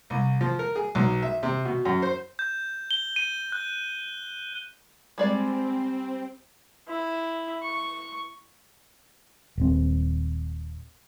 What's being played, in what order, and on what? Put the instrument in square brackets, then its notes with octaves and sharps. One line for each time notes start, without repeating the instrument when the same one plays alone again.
[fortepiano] C2
F3
A#4
G#4
B1
E5
C3
B2
F#2
C5
[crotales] G6
G7
D#7
F#6
[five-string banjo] G3 G#3 D5 [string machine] C4
[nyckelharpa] E4
C#6
[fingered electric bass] D#1 C4